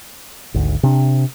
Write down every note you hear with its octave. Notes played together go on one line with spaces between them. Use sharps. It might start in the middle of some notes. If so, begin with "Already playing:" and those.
G#1 D2
C3 D4